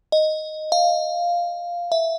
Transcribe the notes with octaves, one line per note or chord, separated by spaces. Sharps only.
D#5
F5
E5